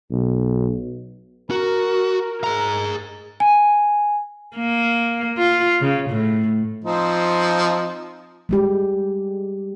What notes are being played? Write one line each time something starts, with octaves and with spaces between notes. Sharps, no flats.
B1
F#4 A#4
G#4 A#5
G#5
A#3
F4
C#3
A2
F3 C4 D#4
G3 G#3 G4